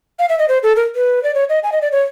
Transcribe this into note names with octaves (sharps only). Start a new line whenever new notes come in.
F5
E5
D#5
C5
A4
A#4
B4
D5
C#5
D#5
G#5
D#5
D5
C#5